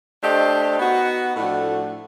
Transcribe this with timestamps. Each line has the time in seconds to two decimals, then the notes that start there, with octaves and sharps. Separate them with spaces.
0.23 A3 D4 G4 C5 D#5
0.79 B3 D#4 F#4
1.36 A2 F3 A3 D4 F#4